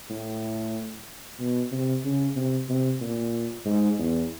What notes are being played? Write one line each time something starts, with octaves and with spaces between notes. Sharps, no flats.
A2
B2
C3
C#3
C3
C3
A#2
G#2
E2